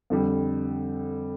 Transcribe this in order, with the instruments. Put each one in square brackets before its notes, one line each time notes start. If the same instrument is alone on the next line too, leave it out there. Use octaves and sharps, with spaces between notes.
[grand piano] F2 D3 G3